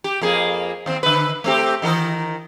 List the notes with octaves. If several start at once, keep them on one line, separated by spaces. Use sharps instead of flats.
G4
F2 A#3 G#4
D#2 C4
D3 B4
A3 C4 G4
D#3 E3 A#4